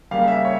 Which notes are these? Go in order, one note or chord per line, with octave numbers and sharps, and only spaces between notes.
C#3 G3 A#3 F5
E5
C#5